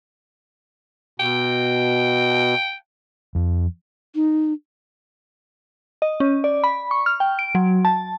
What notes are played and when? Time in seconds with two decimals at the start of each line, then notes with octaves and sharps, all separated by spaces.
1.20 B2 G5
3.35 F2
4.15 D#4
6.02 D#5
6.20 C#4
6.44 D5
6.64 B5
6.91 C#6
7.06 F6
7.20 G5
7.39 D7
7.55 F#3
7.85 A5